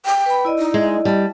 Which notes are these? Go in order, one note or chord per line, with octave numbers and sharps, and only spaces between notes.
G5
B4 B5
E4 D5 D#5
D#4
G#3
G3 A5